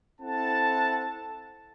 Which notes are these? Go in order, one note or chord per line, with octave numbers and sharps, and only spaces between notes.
C4 E4 A4 F#5 A5